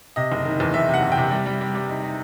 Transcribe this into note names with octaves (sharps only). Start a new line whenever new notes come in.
C3 D#5
F#1
D#3
E2
E2 E5
C3 F#5
F#1
G5
C3
G3
G3
G3
G3
D#4
D#4